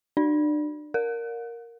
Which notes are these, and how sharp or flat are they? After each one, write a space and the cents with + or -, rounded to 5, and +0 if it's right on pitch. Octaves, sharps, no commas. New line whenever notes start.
D4 +40 D5 +0
A#4 +0 F#5 -45